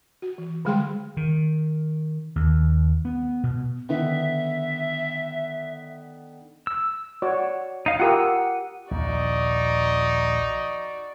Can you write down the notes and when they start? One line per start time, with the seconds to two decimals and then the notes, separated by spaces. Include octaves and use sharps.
0.22 F#4
0.38 E3
0.65 D3 G3 G#3 G#4 G5 C6
1.17 D#3
2.36 D#2
3.05 B3
3.43 B2
3.89 D3 D#3 B3 E5
6.67 E6
7.22 F#4 C#5 D5
7.86 D#4 F5
8.00 F4 G4 A#4 F#5 D#6 E6
8.91 A#1 D#2 D#4 F#4 D5